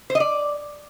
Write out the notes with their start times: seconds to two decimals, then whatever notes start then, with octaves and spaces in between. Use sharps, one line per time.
0.10 C5
0.15 D#5
0.20 D5